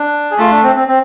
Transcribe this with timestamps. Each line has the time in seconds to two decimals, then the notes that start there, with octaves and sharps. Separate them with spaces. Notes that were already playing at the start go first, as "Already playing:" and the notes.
Already playing: D4
0.31 G#4
0.39 A3 F4
0.51 D4
0.63 C4
0.76 C4
0.88 C4